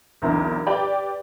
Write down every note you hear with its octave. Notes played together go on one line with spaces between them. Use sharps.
B1 E2 D3 C4 E4 A#4
G4 B4 D5 G5